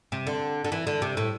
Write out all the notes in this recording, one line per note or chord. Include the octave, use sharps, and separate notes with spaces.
C3
D3
D3
E3
D3
C3
A2